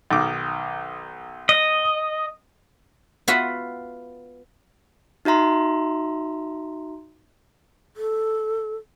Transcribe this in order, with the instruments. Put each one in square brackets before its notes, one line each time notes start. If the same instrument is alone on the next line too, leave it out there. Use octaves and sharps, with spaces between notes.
[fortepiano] B1 D#3 D6
[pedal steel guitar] D#5
[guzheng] B3 F4 F#4 B4 E5 F#5
[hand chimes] D#4 F#4 E5 A#5 C6
[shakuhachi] A4